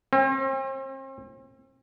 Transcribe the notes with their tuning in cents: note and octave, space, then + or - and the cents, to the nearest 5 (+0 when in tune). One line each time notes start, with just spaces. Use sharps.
C4 +40